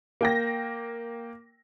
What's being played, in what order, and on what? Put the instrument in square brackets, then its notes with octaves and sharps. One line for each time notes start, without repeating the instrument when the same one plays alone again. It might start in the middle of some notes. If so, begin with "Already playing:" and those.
[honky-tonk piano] A#3 G5 A#6